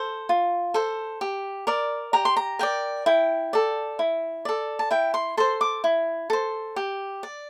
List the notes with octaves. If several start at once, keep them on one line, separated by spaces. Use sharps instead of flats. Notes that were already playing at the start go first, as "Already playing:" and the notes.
Already playing: A4 C5
F4
A4 C5
G4
A#4 D5
G4 A#5
C6
A#5
A#4 D5 G5
E4 G5
A4 D5
E4
A4 D5
A5
E4 G5
C6
A4 C5 C6
D6
E4
A4 C5
G4
D5